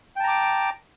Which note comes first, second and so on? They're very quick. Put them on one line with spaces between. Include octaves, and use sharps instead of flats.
G5 A5 A#5 D6